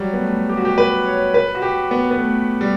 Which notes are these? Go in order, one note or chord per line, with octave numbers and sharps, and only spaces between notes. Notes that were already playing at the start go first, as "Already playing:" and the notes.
Already playing: F#3 G3
B3
A3
G4
F#4
G4
B4
C#5
B4
F#4
G4
B3
B3
A3
G3